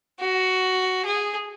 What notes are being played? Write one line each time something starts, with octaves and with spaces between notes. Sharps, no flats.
F#4
G#4